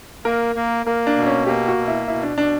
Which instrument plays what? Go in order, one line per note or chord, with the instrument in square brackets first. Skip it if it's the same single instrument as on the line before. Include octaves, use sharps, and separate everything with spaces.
[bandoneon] A#3 [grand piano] A#4
[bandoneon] A#3
[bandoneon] A#3 [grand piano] A#4
[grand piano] D4
[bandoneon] B2
[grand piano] C#4
[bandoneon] A#3 [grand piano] G4
[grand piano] F#4
[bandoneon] B2
[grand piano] E4
[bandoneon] B2 [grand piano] E4
[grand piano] D4
[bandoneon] B2 [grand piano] D4